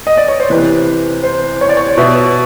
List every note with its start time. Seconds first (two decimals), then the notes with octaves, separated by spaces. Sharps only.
0.07 D#5
0.17 D5
0.28 C#5
0.40 C5
0.50 C3 E3 B4
1.23 C5
1.61 C#5
1.69 D5
1.77 C#5
1.97 B2 E5